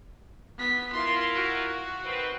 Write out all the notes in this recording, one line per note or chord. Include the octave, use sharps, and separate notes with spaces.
B3 B6
E4 F4 A#4 C6
F#4
D#3 C4 B4